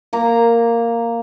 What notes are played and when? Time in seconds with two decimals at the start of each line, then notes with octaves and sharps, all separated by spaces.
0.13 A#3 A#5